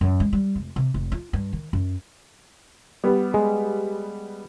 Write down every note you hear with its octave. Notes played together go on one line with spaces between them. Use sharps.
F#2
G#3
G3
F1
C3
F1
F4
G2
D#3
F#2
G3 B3
G#3